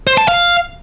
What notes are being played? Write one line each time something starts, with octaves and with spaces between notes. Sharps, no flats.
C5
A5
F5